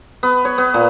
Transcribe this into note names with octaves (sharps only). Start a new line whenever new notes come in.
B3
C#5
B3
A#2